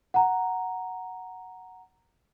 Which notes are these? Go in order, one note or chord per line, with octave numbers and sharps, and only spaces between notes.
F#5 A#5